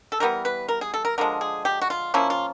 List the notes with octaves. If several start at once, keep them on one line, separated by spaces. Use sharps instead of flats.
A4
E3 G3 B3 A#4
B4
A#4
G#4
A4
A#4
D3 F3 G#3 A#4
G#4
G4
F#4
F4
F3 A#3 C#4 E4
F4